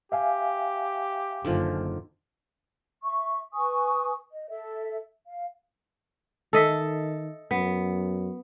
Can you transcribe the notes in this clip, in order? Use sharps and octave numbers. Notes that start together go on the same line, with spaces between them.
G4 E5 F5 G#5
F#1 D3 D#3 F3
E5 C#6
B4 G#5 C#6 D#6
D#5
A4 E5
F5
D#3 A4 D#5 E5
F#2 B3